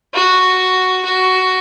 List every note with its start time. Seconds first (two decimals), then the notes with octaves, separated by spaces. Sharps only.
0.14 F#4
1.05 F#4